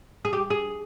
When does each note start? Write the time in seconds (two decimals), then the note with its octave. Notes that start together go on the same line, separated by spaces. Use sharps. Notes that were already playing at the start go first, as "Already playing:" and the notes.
0.25 G#4
0.33 G4
0.50 G#4